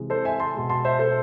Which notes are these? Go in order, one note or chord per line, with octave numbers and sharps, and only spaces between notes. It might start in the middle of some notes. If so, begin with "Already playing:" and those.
Already playing: C3 E3 G#3
A4 C5
E5 G#5
A5 C6
B2 G#3
A5 C6
C5 E5
A4 C5